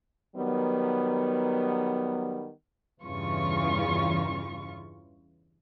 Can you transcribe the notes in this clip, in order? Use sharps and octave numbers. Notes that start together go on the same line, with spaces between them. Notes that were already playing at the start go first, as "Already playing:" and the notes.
D#3 F#3 G3 B3
E2 G2 C#3 E3 F4 C#6